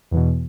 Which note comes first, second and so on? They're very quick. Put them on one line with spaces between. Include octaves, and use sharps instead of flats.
E2 E3 B2